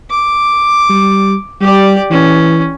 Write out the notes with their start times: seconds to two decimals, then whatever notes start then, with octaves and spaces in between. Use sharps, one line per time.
0.11 D6
0.89 G3
1.61 G3 G4 D5
2.11 E3 C#4